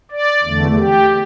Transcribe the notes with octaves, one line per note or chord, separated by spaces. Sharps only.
D5
E2 D3 A3
G4